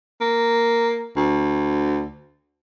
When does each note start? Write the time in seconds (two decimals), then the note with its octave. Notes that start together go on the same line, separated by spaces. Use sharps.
0.21 A#3
1.17 D2